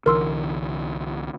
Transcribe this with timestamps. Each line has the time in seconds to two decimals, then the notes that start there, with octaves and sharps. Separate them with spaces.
0.06 C2 D3 E3 A#4 C6 E6